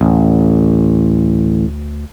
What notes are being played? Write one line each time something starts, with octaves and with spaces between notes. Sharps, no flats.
A1 D2